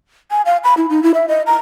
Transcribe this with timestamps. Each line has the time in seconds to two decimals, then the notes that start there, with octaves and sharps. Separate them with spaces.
0.31 G#5
0.45 F5
0.64 B5
0.77 E4
0.90 D#4
1.03 E4
1.14 E5
1.28 D#5
1.47 A#5